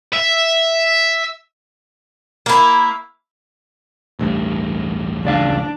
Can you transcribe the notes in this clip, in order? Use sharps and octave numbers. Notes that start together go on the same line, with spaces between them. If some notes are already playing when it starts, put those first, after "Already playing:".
E5
A#3 E4
A1 D2 G2
C#2 D4 D5 F5